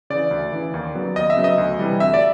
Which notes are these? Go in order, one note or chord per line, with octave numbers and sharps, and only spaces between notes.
C#3 E3 D5
D2
C#3 E3
D#2
C#3 F#3 B3
D#2 D#5
E5
C#3 F#3 B3
D#5
D2
C3 E3 G3
D2 E5
D5